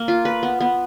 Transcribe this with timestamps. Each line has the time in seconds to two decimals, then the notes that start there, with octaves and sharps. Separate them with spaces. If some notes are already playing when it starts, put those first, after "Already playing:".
Already playing: A#3
0.08 F4
0.25 B4
0.43 B3
0.61 B3